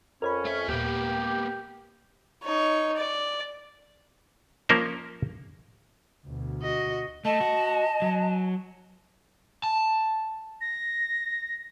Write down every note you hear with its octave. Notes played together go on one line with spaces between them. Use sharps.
F2 C#4 A#4 C#5 B5
A3 E5 G#6
D#2 A#2 A#3 B3 G4 A#4
D#4 C#5
D5
F3 A#3 C#4 A#4 C5
D2 B2
F#4 D#5
A3 D#5 A5
F#4
F#3
A5
A#6